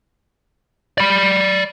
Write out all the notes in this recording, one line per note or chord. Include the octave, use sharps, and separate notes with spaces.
D5 B5